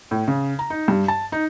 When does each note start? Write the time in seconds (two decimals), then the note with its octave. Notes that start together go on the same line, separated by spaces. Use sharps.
0.11 A2
0.28 C#3
0.59 A#5
0.70 D#4
0.88 G2
1.08 A5
1.32 D#4